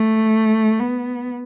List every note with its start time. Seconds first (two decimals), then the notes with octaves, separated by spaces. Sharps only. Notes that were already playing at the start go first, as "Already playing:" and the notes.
Already playing: A3
0.79 B3